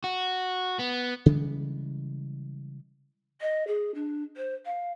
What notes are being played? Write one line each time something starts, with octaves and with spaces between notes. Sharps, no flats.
F#4
B3
C#3 E3 G3 G#3
D#5
G#4
D4
C5
F5